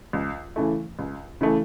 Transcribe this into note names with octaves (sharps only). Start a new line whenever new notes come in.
C#2
C#3 E3 A3
C#2
C#3 E3 A3